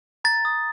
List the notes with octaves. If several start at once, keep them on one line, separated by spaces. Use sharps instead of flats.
A#5 A6
D#6